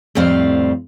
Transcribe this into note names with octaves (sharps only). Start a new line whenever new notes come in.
F2 A2 G3 C4 F5